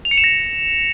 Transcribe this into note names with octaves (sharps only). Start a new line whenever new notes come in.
F7
C#7
E7
A#6